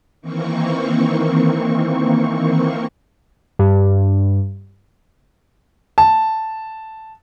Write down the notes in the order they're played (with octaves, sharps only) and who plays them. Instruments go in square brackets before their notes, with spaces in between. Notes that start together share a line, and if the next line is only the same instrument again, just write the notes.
[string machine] D#3 E3 A#3 C4 C#6
[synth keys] G2
[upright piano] A5